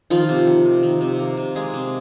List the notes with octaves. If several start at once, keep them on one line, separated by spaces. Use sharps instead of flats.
D#3 F3 F4
C3
D#3
C3
D#3
C3
A#3
C3
G#3 A#3 G#4
C3